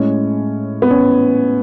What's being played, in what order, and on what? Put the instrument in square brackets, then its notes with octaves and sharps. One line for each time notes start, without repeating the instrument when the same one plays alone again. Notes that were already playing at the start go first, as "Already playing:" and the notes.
Already playing: [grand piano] A2 G#3 C#4
B3
C#4